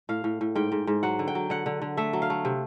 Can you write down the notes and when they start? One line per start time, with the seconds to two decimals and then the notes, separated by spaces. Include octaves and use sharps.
0.09 A2 F5
0.24 A2
0.41 A2
0.55 G#2 G5
0.72 G#2
0.87 G#2
1.03 F#3 F#5
1.19 D3
1.28 G5
1.35 F#3
1.50 D3 F#5
1.66 D3
1.82 D3
1.97 A3 E5
2.13 F#3
2.22 F5
2.30 A3
2.45 C3